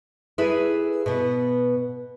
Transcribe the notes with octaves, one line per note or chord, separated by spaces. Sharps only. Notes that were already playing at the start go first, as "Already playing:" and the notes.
E4 G#4 A4 B4
B2 B3